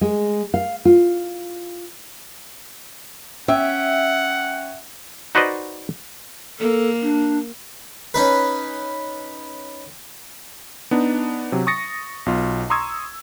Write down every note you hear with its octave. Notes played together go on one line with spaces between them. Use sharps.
G#3
F5
F4
C#4 E5 F#5 G5
D#4 F#4 B4 C5 D5 D#5
A#3 A4
D4
C#4 D#4 B4
B3 D4 D#4
C3 F#3
C#6 D#6 A6 A#6 C#7
B1 B2 F4
A#5 C6 C#6 D#6 E6 G#6